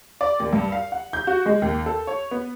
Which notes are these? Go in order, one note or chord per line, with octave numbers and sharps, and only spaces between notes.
D5
D#2
G2
F5
F#5
G6
F#4
G#3
D#2
A4
C#5
B3